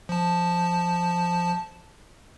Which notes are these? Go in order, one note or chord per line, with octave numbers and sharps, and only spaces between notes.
F3 A5